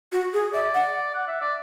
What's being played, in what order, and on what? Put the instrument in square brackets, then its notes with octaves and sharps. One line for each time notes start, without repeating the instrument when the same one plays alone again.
[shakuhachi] F#4
G#4
[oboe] D5 [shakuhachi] E5
[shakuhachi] F#5
[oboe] F#5
E5
D5